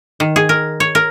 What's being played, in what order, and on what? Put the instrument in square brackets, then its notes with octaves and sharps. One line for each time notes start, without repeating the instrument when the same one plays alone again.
[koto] D#3
G#4
A#4
C#5
A#4